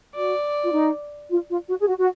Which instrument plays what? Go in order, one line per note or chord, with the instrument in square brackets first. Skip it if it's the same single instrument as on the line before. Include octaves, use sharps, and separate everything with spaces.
[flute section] F#4 [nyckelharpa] D5
[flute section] F4
D#4
F4
F4
F#4
G#4
F#4
F#4